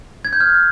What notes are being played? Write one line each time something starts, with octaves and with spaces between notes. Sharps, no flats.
G#6
G6
F6